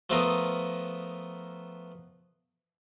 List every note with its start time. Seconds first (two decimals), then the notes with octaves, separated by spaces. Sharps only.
0.10 F3 A3 B3 F4 A#4 D#5